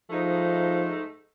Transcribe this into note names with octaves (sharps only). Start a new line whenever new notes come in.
G#2 F3 A3 D#4